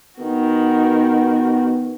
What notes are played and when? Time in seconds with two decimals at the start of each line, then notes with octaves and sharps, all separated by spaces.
0.19 D#3 B3 F#4